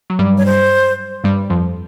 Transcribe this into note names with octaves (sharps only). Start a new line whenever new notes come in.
F#3
G2 G3
C#5
C5
G2 G3
F2 F3